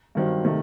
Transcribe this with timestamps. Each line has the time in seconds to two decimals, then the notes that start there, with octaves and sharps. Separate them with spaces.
0.15 G2 D#3 F#3 C4
0.45 C3 D#3 A3